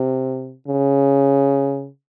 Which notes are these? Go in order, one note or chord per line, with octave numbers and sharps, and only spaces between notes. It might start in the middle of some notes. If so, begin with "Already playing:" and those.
Already playing: C3
C#3